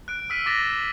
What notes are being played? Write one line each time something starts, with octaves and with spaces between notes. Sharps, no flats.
F#6 D7
E6 F6 B6 C7 D#7
D6 A6 A#6 E7